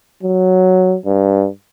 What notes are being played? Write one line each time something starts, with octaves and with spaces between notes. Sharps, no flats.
F#3
G2